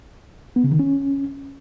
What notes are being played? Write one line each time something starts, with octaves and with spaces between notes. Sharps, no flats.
B3
C#3
D#3
C#4